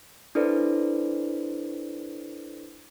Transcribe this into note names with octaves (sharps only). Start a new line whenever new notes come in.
D4 E4 A4 B4 C5 D5